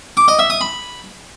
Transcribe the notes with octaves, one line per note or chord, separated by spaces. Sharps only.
D6
D#5
E5
D#6
B5